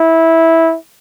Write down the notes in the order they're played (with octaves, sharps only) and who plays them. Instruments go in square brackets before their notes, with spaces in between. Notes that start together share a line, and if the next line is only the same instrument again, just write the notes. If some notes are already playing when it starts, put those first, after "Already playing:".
Already playing: [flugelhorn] E4